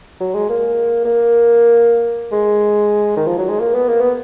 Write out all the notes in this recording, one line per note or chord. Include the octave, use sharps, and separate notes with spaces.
F#3
G#3
A#3
A#3
G#3
D#3
F3
F#3
G#3
A#3
B3
A#3
B3